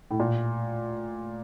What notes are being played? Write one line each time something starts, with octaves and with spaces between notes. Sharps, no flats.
A2
A#2